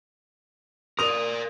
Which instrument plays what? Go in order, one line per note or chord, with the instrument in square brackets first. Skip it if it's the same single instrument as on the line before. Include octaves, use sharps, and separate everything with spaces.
[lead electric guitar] A#4 D5 [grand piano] D#6 F7